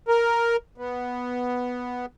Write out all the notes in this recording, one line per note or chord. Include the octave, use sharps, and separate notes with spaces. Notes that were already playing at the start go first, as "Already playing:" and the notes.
A#4
B3